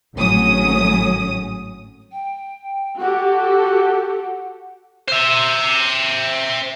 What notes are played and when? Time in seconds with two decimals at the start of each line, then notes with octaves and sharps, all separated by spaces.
0.15 G#1 A2 F#3 C#4 D#6
2.12 G5
2.99 F#4 G4 A4 F#5
5.08 C5 E5